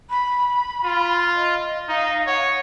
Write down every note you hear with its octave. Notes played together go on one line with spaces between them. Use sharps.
B5
F4
D#5
D#4 F5
C#5 F#5